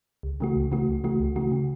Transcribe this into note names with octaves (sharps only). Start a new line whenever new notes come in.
C#2
C#3 E3 A3 F#4
C#2
C#3 E3 A3 F#4
C#2
C#3 E3 A3 F#4
C#2
C#3 E3 A3 F#4
C#3